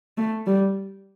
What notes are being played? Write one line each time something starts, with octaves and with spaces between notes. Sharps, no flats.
A3
G3